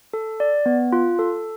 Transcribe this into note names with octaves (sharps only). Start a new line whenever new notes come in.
A4
D5
B3
F4
A4